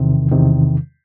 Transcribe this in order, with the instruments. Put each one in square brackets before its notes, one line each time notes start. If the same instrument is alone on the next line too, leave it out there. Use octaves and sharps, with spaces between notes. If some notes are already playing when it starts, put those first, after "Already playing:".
Already playing: [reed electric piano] E2 C3 D#3
E2 C3 D#3